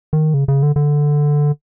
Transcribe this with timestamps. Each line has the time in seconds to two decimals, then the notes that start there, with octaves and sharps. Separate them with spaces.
0.13 D#3
0.34 C#3
0.48 C#3
0.63 D3
0.76 D3